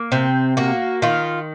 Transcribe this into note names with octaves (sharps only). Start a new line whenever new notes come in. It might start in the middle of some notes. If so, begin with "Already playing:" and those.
Already playing: A#3
C3 C4
A#3 F#4
D#3 F4